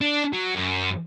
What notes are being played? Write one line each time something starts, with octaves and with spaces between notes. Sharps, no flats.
D4
F#3
F#2